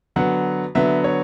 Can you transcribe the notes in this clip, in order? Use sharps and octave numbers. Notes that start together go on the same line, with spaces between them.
D3 F#3 B3 F#5
D3 F#3 B3 E5
C#5